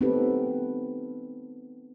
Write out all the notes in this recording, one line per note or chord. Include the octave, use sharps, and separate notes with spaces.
B3 C4 D#4 G4 A4 B4